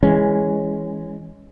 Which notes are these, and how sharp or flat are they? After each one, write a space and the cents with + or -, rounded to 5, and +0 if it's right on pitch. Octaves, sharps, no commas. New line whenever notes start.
E3 +0 G#3 -10 C#4 +0